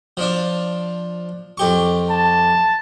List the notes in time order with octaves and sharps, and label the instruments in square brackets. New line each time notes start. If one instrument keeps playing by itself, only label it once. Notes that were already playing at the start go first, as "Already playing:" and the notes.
[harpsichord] F3 D4
F2 G4 C#6
[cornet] A5